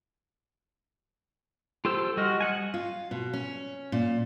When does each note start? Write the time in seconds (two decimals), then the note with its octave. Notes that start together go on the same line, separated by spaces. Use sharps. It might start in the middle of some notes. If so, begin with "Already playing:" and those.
1.85 F4 G4 A4 C5 E6
2.17 G3 F#4 D#5 F6
2.41 D#5 F#5 G#5
2.74 F4
3.11 B2
3.33 C#4
3.92 A#2